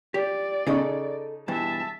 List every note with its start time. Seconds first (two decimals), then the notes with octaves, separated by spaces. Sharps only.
0.14 G4 D5
0.67 C#3 D#4 G#4 A4 D#5 C#6
1.48 G2 B2 E3 E5 A5